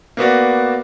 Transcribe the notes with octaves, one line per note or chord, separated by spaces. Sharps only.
A#3 B3 F#4 D5